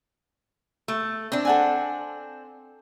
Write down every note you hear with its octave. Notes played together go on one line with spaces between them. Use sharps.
A3
C4 D4
A4 F#5 G#5